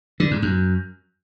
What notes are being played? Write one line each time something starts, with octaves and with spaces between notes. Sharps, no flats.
D3
G#2
F#2